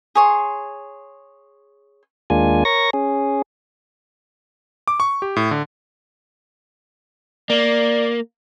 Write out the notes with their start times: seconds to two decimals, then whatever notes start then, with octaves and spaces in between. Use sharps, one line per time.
0.15 G#4 C#5 C6
2.30 D#2 G#3 A#3 D4 F4 G#5
2.65 A#4 C#5 C#6 A#6
2.93 C#4 G#4
4.88 D6
5.00 C#6
5.22 G4
5.36 A2
5.51 D3
7.50 A#3 D5